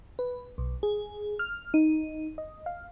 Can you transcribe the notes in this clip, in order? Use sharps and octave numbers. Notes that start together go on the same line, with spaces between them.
B4
B1
G#4
F6
D#4
D#5
F5